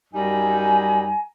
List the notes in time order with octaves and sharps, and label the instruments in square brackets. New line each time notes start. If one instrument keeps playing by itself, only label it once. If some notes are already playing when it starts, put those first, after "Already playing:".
[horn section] F#2 G3 D#4 [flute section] G#5 A#5